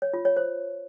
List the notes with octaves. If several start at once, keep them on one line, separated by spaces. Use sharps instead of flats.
C#5
F4
C#5
C5